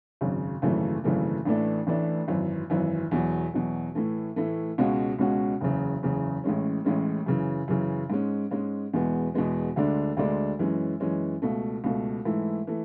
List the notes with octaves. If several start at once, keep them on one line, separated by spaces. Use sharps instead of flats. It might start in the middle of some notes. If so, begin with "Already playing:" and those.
G#1 F#2 C#3
G#1 F#2 C#3 E3 A3
G#1 F#2 C#3 E3 A3
A1 A2 E3 A3 D4
A1 A2 E3 A3 D4
G#1 F#2 E3
G#1 F#2 E3
E2 B2 F#3
E2 B2 F#3
A2 E3 A3
A2 E3 A3
C#2 B2 G#3 C#4 F#4
C#2 B2 G#3 C#4 F#4
F#1 E2 C#3
F#1 E2 C#3
A1 A2 G#3 C#4
A1 A2 G#3 C#4
F#2 C#3 E3
F#2 C#3 E3
G#2 G#3 C#4
G#2 G#3 C#4
E2 B2 G#3 B3
E2 B2 G#3 B3
D2 D3 G#3 D4
D2 D3 G#3 D4
F#2 E3 G#3 C#4
F#2 E3 G#3 C#4
C#2 B2 A3
C#2 B2 A3
G#2 E3 A3 E4
E3 A3